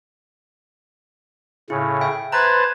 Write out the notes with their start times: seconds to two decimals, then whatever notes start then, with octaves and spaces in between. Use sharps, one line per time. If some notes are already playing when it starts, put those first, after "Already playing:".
1.70 A2 C#3 E4
2.01 E5 G5
2.32 B4 C5 A5 A#5 F#6 G#6